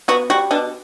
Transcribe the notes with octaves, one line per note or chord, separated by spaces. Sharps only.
B3 F#4
G3 F#4
B2 D4